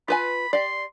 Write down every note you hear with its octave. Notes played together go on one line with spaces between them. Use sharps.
F4 B4 G#5 B5
G4 D5 C6